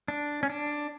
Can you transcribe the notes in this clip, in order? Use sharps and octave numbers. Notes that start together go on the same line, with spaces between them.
D4
C#4
D4